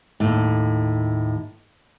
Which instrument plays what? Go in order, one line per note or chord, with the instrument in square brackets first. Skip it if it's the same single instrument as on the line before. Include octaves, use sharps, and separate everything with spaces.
[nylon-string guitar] D#2 A2